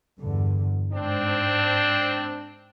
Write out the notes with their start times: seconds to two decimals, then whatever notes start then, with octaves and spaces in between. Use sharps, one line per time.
0.20 E2 G2 D3
0.93 G#2 C4 D4